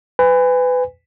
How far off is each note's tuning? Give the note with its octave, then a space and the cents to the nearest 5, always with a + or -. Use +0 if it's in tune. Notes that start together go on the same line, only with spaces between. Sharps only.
B4 +25 G#5 -25